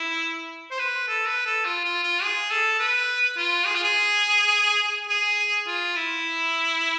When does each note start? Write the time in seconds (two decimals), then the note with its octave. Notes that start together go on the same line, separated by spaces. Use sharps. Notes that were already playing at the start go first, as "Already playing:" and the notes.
Already playing: E4
0.71 C5
0.79 B4
1.08 A4
1.27 B4
1.46 A4
1.65 F4
1.84 F4
2.04 F4
2.23 G#4
2.51 A4
2.80 B4
3.37 F4
3.66 G#4
3.75 F4
3.83 G#4
5.09 G#4
5.67 F4
5.96 E4